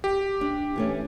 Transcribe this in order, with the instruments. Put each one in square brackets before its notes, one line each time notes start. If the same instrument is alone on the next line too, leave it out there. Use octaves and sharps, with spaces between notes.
[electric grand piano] G4
[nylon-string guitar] D4
E3 A3 C#4